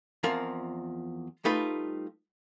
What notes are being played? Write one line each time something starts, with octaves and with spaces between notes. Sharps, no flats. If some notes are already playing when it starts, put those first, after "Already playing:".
E2 F3 C4 F4 A#4
G3 A3 D#4 F4 B4